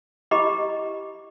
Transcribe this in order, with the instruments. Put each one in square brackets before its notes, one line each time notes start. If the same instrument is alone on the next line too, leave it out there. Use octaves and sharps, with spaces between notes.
[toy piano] E4 G4 D#5 A#5 B5 D6